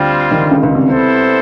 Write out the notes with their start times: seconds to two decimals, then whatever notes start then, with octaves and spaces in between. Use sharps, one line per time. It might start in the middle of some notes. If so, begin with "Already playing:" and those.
Already playing: D2 D3 G3 C4 F4
0.31 D#3
0.41 D3
0.51 C#2 C#3
0.63 C#2 C#3
0.75 C2 C3
0.87 B3 E4 A4 C5